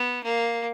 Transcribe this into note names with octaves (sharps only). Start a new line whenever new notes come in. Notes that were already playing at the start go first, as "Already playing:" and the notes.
Already playing: B3
A#3